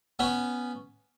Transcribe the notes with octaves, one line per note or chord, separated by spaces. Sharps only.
B3 C#4